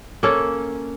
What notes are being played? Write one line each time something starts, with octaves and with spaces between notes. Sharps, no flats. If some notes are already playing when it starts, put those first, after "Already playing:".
A#3 C#4 A4